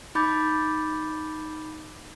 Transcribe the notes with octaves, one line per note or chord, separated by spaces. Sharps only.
D#4 B5 D6 G6 A6